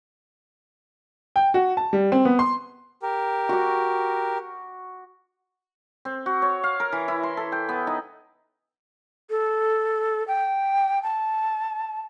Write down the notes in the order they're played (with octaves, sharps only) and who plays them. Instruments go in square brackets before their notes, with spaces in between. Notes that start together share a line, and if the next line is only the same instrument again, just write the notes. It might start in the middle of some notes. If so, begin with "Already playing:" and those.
[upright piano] G5
F#4
A5
G3
C4
B3
C6
[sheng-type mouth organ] G4 A#4
[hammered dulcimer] F#4 D6
C4
F#4
C#5
F5
A#4
E3
E4
C6
A4
G5
B3
D#4
[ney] A4
G5
A5